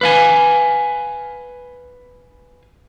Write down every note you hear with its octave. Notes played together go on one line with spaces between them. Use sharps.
B4 F5 G#5